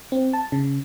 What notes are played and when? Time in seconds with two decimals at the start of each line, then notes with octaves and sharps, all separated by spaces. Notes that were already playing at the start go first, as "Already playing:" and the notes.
0.12 C4
0.33 A5
0.52 C#3